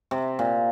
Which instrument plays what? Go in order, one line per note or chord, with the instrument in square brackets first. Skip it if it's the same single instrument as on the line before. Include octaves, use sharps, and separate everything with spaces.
[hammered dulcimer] C3
A#2